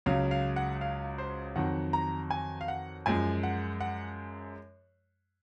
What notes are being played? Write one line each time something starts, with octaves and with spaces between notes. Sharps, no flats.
C#2 C#3 F#3 F5
F5
F#5
F5
C5
F2 D#3 F#3 F#5
A#5
G#5
F5
F#5
F#2 F3 G#3 G#5
F#5
F#5